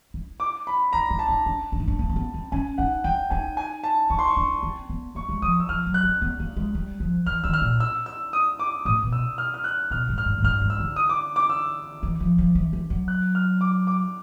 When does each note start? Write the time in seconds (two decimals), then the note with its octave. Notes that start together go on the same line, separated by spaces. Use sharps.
0.14 E4
0.40 D6
0.67 B5
0.93 D#4 A#5
1.10 E4
1.19 A5
1.29 D#4
1.46 D4
1.72 D4
1.80 D#4
1.88 D4
1.99 A#3
2.10 C4
2.16 B3
2.34 C4
2.52 C#4 G#5
2.78 D#4 F#5
3.04 E4 G5
3.30 D#4 G#5
3.57 G#5
3.83 A5
4.10 D#4 C#6
4.19 C6
4.28 C#6
4.37 D4
4.63 C4
4.89 B3
5.15 A#3 C#6
5.29 G#3
5.42 F3 D#6
5.60 E6
5.69 F3 F6
5.87 F#3
5.94 F#6
6.03 C4
6.22 B3
6.40 A#3
6.57 G#3
6.75 G3
7.00 F3
7.26 E3 F6
7.44 D#3 E6
7.53 F6
7.62 A#2
7.80 E6
8.06 E6
8.33 D#6
8.59 D6
8.85 A2 D#6
9.03 B2
9.12 E6
9.38 F6
9.54 F6
9.64 F#6
9.90 B2 F6
10.09 G#2
10.18 F6
10.26 G#2
10.38 G#2
10.44 G2 F6
10.61 G#2
10.70 E6
10.80 D3
10.96 D#6
11.09 D6
11.36 D6
11.50 E6
12.03 E3
12.20 F3
12.38 F3
12.55 E3
12.73 E3
12.90 F#3
13.08 F#6
13.35 F6
13.61 D6
13.87 D6